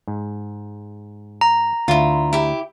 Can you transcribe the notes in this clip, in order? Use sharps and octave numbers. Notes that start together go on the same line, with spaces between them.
G#2
A#5
D2 E4 F4
E4 G4